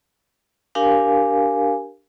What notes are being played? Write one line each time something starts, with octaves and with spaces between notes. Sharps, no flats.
D4 G4 A#4 F5 G#5